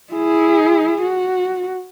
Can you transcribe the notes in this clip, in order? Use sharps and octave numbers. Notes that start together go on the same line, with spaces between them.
E4 G#4
F#4